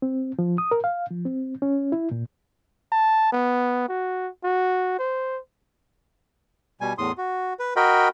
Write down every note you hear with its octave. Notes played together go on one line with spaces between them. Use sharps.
C4
F3
D#6
A#4
F5
F3
C4
C#4
E4
A#2
A5
B3
F#4
F#4
C5
B2 G3 G#5
E2 A2 C6 D#6
F#4
B4
F#4 A#4 D#5 G5 B5